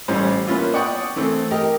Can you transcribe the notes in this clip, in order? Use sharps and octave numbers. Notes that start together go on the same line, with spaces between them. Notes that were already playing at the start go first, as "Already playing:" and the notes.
A1 E3 G3 C#4 C5
A#3 B3 C#4 E4 F4
D5 F#5 G5 C#6 D#6
E3 A3 C4
G4 A#4 D#5